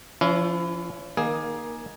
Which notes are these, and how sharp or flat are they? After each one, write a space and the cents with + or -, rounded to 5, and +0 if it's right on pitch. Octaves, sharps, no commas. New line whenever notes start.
F3 -20 C#4 +40 E4 +20
D#3 +0 A#3 +20 G#4 +0